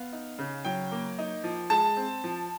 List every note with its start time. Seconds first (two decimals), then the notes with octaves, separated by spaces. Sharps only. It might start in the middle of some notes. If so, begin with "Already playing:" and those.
Already playing: B3 F5
0.13 D#4
0.39 C#3
0.65 F#3 G5
0.92 A#3
1.19 D#4
1.44 F3
1.70 G#3 A5
1.97 C4
2.24 F3